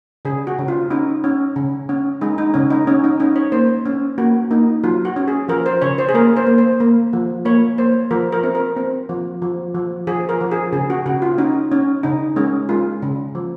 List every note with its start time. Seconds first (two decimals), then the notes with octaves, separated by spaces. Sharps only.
0.25 C#3 G#4
0.47 F#4
0.59 C#3
0.68 F4
0.90 C#4 D#4
1.24 C#4
1.56 C#3
1.89 C#4
2.21 G#3 D#4
2.38 D#4
2.54 C#3 C#4
2.70 D#4
2.87 C#4
3.04 D#4
3.20 C#4 D#4
3.36 C#5
3.52 A#3 C5
3.86 C#4
4.18 A#3 F#4
4.51 A#3 D#4
4.84 F#3 F4
5.05 F#4
5.16 C#4
5.28 G#4
5.48 F3 A#4
5.66 C5
5.82 C#3 C#5
5.98 C5
6.09 G#4
6.14 A#3 A#4
6.36 C5
6.47 A#3
6.58 C5
6.80 A#3
7.13 F3
7.45 A#3 C#5
7.78 A#3 C5
8.11 F3 A#4
8.32 A#4
8.43 C4
8.55 A#4
8.77 C4
9.09 F3
9.42 F3
9.75 F3
10.07 F3 G#4
10.29 A#4
10.41 F3
10.52 G#4
10.73 C#3 G#4
10.90 F#4
11.06 C#3 F#4
11.22 F4
11.38 C#4 D#4
11.72 C#4
12.03 C#3 D#4
12.36 G#3 C#4
12.69 G#3 F4
13.02 C#3
13.35 F3